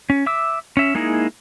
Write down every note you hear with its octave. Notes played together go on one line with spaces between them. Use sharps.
C#4
E5 D6 E6
C#4 E5
G#3 A#3 D#4 E4 G#4